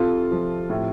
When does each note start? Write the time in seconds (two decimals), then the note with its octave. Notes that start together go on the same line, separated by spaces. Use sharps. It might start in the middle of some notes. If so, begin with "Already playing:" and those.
Already playing: C3 F4 A4
0.31 F3
0.70 A2